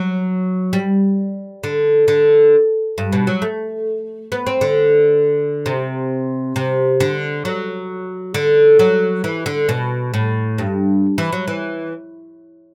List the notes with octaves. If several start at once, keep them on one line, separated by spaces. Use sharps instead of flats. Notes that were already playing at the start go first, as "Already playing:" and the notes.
Already playing: F#3
G3
D3
D3
G2
B2
F#3
A3
B3
C4
D3
C3
C3
D3
F#3
D3
F#3
E3
D3
B2
A2
G2
E3
F#3
E3